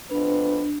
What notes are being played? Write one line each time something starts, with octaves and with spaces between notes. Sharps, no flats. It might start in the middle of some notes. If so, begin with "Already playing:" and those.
F2 B3 D4 B4